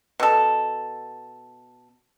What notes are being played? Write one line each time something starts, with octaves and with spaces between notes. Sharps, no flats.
B2 A4